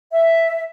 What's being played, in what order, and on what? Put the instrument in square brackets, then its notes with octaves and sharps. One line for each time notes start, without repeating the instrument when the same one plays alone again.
[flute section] E5